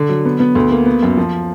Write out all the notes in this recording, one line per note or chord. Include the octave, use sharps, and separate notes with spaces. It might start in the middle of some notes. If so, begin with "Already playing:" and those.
Already playing: D3
F#3
B3
B3
D2
A#3
B3
F#2
F3